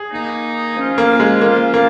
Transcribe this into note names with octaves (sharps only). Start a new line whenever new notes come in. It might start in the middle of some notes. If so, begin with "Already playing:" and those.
Already playing: G#4
D#3 A#3 D#4
F3 C#4 F4
A#3
G#3
F3 A#3 C#4 F4
A#3